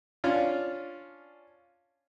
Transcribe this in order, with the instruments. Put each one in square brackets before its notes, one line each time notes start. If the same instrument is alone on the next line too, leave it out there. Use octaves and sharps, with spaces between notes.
[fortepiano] C#4 D4 F4